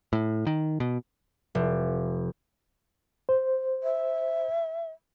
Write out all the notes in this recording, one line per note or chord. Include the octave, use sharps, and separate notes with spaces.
A2
D#3
B2
F1
C5
E5